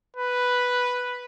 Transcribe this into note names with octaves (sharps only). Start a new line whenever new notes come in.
B4